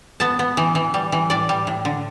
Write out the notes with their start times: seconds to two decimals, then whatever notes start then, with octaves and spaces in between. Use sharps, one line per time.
0.20 B3 A5
0.39 B3
0.57 E3
0.75 E3
0.94 G3
1.12 E3
1.30 A2 D5
1.49 G3
1.67 A2
1.85 D3